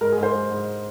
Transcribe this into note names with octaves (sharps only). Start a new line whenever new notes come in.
G#2 A#4
G#4
G#2
C5
G#2
G#2